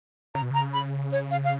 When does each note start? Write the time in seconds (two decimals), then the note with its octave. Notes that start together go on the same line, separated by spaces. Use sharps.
0.35 C#3 A#5
0.42 B2
0.51 C#3 A#5
0.73 B5
1.12 C#5
1.31 F5
1.44 F5